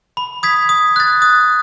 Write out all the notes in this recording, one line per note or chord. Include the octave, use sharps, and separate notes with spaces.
B5
D#6 G#6 B6
D#6
F#6 A6
D#6